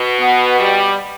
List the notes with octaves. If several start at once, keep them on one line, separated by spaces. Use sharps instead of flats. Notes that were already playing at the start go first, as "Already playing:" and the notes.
Already playing: B2
B3
G3